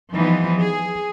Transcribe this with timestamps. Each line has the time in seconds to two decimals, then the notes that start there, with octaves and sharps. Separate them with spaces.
0.13 E3 F3 G3 B3 D#4
0.61 G#4